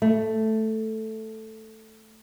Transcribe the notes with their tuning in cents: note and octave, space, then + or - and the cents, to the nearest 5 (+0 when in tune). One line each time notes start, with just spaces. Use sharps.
A3 +0